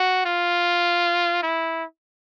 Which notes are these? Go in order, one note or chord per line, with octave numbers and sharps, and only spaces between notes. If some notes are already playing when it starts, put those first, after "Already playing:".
Already playing: F#4
F4
E4